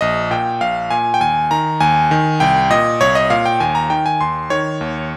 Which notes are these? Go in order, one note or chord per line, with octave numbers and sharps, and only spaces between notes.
A#1 D#5
A#2 G5
A#1 F5
A#2 G#5
G5
D#2 G#5
D#3 A#5
D#2 G#5
D#3
C2 G5
A#2 D#5
C2 C#5
D#5
A#2 F5
G5
D#2 G#5
A#5
D#3 G5
G#5
D#2 C6
D#3 C#5
D#2